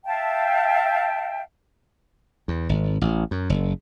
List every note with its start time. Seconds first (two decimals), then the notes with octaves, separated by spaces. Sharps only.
0.06 E5 F5 G5 A5
2.48 E2
2.69 G#1
3.01 A1
3.31 F#2
3.50 F#1